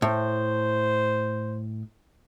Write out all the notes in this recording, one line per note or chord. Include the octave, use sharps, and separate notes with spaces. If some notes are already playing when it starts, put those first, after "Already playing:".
A2 C5